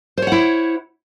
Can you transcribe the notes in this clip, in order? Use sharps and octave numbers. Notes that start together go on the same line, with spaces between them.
E4 C5 C#5 F#5